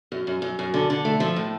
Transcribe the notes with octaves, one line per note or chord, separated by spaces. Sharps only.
F#2
F#2
F#2
F#2
D3
D3
A3
F3
A2